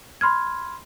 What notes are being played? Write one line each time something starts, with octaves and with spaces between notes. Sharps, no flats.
B5 C6 F6 G#6